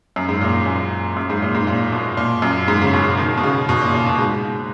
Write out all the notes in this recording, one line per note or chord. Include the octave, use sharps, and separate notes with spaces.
F#2
G#2
A#2
F#2
F#2
G#2
A#2
G#2
A#2
B2
A#2
F#2
G#2
C#3
B2
D#3
B2
C#3
B2
A#2
A#2
B2
G#2